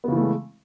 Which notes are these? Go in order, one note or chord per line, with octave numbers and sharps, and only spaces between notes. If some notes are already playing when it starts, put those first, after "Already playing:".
C#3 E3 G#3 A3 B3